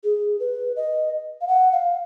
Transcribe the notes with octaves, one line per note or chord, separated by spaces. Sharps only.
G#4
B4
D#5
F5
F#5
F5